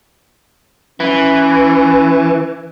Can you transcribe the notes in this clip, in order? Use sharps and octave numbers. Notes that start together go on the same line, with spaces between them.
E3 C#4